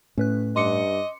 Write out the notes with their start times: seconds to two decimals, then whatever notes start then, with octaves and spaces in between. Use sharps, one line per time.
0.18 A2 C#4 B4 F#6
0.56 G2 D#5 C6 D6 C#7